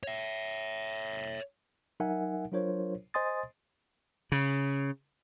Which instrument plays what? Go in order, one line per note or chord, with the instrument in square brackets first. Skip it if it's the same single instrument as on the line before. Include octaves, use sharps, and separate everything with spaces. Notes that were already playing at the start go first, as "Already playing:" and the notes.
[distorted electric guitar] C#5 E5
[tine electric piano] F#3 D#4 A#4 E5 F#5 G#5
F#3 D4 F4 A#4 C5 C#5
C5 D#5 G#5 C6 D#6 A6
[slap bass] C#3